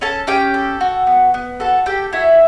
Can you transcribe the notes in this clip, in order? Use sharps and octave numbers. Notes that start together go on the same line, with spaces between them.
C#4 A4 A5
C#4 G4 G5
A4
F#4
B3
B3
F#4 A4 A5
G4 A4 G5
E4 F#4 E5